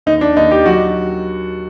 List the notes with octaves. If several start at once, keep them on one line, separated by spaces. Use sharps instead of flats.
D#2 D#4
D4
D#2 D#4
G4
F#3 F#4